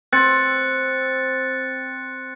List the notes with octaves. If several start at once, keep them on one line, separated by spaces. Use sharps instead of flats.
C4 F#6 A6 C#7